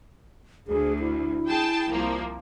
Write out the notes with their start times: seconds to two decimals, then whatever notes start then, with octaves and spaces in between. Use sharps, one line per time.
0.68 D2 G#4
1.00 E4
1.47 G#4 G5 A5
1.89 C2 F3 A#3